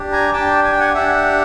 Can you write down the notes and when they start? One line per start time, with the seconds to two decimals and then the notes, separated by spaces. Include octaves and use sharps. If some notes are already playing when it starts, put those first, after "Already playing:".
Already playing: D4 G4
0.12 G#5 A#5
0.32 D4 G4 G5 A5
0.64 G#5
0.72 G5
0.80 F#5 G#5
0.94 D4 G4 E5 F#5